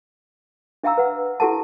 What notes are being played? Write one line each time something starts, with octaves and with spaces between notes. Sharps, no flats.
D4 E5 F5 G5 A#5 E6
B4 F#5
E4 G4 A4 F#5 A5